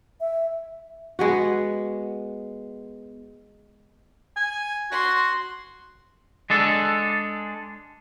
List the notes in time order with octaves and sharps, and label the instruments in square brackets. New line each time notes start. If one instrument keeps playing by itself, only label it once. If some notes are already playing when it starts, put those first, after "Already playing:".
[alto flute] E5
[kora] G#3 B3 F#4
[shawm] G#5
[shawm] F#4 [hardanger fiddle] C6
[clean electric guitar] G#3 D4 A4